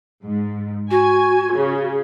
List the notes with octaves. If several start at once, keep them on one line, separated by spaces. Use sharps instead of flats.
G#2
F#4 G#5
C#3